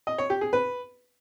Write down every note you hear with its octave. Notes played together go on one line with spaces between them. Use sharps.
D#5
C#5
G4
G#4
B4